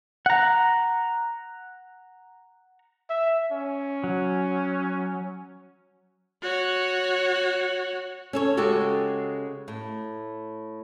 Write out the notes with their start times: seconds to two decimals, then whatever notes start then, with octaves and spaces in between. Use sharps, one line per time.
0.26 F#5 A#5
3.10 E5
3.52 C#4
4.04 F#3
6.42 F#4 C#5
8.33 C#4 A4 C#5
8.57 C#3 G#3 F#4 G4 A4
9.68 A2